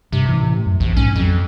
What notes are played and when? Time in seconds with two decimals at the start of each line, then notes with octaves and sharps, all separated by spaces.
0.12 G2 C3
0.29 A2 E3
0.66 F#2
0.80 A#1 E2
0.97 A#1 G#2 C#4
1.15 F2 F3 F#3